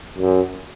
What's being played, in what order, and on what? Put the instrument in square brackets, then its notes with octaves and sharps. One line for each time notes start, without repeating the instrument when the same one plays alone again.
[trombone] F#2